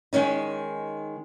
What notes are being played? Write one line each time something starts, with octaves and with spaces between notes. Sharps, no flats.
D#3 G#3 C#4 D#4